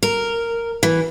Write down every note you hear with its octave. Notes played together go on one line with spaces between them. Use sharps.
A#4
E3